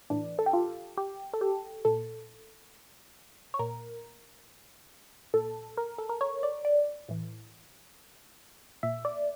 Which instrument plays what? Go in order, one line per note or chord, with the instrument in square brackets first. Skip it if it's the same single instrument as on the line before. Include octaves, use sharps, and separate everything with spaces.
[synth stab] A2 E3 D4
A4
G4
F4
G4
A4
G4
A#2 A4
C#5
A#2 A#4
A#2 A4
A#4
A4
A#4
C#5
D5
D5
A2 E3
A#2 E5
D5